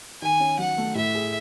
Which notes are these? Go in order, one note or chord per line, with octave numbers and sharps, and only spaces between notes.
D#3 G#5
C#4
F#3 F#5
A3
A2 E5
G#4